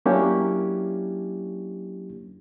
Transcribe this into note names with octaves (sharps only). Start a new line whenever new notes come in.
F#3 A#3 C#4 D4 E4 G4